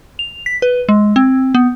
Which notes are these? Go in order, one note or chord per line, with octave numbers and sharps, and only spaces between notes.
F7
B6
B4
G#3
C4
B3